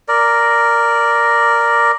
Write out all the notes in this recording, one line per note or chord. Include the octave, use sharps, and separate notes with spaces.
A#4 D5